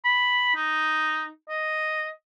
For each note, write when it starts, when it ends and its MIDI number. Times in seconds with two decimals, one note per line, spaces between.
0.05 0.52 83
0.56 1.28 63
1.49 2.08 75